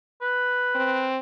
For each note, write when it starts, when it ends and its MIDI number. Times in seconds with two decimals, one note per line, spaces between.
0.22 1.10 71
0.75 1.19 60